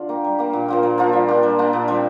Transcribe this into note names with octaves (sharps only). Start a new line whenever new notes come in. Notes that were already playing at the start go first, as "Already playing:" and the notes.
Already playing: D3 D4 F4
A#3 G4
G3
A#3 G4
A#2
F3 A#3 F4
A#2
F3 A#3 F4
G3
A#3 D4 G4
G3
A#3 D4 G4
A#2
G3 C4 F4